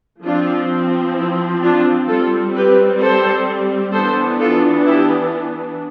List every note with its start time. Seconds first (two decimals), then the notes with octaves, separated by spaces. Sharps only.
0.24 F3 C4 D4 F4
1.16 E4
1.63 D4 F4
2.08 G3 C4 F4 A4
2.55 G4 B4
3.01 A4 C5
3.93 E3 B3 D4 A4 C5
4.40 F4 A4
4.86 E4 G4